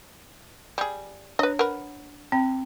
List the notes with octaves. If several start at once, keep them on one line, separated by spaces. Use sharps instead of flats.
G3 G#4
D4 B4 C#5 D#5
A#4 B4 F#5
C4 G5 B5